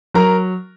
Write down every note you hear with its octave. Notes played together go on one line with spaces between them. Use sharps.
F#3 A#4 A#5